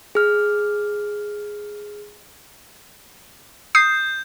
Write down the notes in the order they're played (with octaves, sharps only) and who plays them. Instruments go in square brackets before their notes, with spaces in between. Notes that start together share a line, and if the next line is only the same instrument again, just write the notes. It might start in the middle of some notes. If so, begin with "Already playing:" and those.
[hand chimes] G#4 F6
[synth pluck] D#6 C7 [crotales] G6